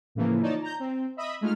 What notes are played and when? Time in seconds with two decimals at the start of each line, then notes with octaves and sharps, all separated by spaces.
0.15 A2 C#3 E3 F3 A#3
0.42 D#4 F4 C#5 D5 A5
0.62 A#5 G6
0.80 C4
1.17 D#5 E5 B5 D#6
1.41 G#3 A3 D#4 F4 F6